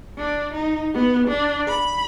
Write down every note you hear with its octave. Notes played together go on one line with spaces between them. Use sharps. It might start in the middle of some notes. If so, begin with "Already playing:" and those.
D4
D#4
B3
D4
B5